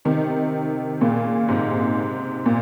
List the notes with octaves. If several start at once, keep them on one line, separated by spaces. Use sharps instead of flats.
C3 D#3
A#2 C#3
G#2 C3
A#2